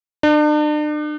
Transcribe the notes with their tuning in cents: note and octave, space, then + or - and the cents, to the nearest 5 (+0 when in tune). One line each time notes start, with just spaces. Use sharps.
D4 +40